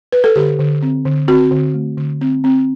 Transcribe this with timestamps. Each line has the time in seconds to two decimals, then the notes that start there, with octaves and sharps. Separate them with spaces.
0.12 B4
0.24 A4
0.36 D3 G4
0.59 D3
0.82 C4
1.05 D3
1.28 C4 F#4
1.51 D3
1.74 A3
1.97 D3
2.21 C4
2.44 C4